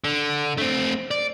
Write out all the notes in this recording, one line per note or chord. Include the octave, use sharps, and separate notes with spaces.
D3
A3 C4
D5